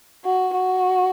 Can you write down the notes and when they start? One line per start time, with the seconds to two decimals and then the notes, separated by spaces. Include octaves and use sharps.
0.25 F#4
0.55 F#4